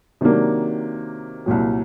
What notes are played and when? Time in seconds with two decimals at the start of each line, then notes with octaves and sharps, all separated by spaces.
0.21 C3 D#3 F#3 A#3 D4
1.46 C2 A#2 F#3